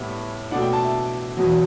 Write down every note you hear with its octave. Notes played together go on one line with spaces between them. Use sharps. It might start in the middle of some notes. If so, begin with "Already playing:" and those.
Already playing: A2 G3 B3 E4
B2 A3 D4 F#5
G5
A5
E5
E2 B2 F#3